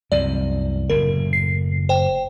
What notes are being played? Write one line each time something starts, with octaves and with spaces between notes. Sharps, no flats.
C2 F#2 C3 D5
F#1 F#2 A2 A#4
C7
C5 G5